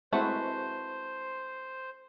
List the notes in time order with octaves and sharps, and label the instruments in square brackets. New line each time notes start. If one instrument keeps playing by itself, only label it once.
[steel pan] G#3 C4 E4 [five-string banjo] A3 F#4 B4 [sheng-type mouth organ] C5